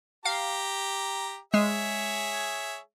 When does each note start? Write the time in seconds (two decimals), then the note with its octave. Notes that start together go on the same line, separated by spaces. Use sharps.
0.25 G4 F5 A#5
1.54 G#3 G#4 C#5 E5